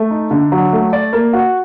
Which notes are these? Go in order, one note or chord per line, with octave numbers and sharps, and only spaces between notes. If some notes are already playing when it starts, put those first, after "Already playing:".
Already playing: A3
D#4
D3
F#3
A3
D5
A#3
F#4